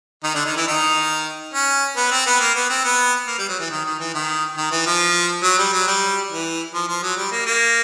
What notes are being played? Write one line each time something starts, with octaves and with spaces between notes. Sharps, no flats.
D#3 D#4
D3 D4
D#3 D#4
E3 E4
D#3 D#4
C#4
B3
C4
B3
A#3
B3
C4
B3
A#3
G3
F#3
E3
D#3
D#3
E3
D#3
D#3
E3
F3
F#3
G3
F#3
G3
E3
F3
F3
F#3
G3
A#3
A#3